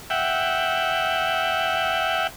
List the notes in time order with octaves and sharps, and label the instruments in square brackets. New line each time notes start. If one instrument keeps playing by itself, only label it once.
[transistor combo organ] E5 F#5 G5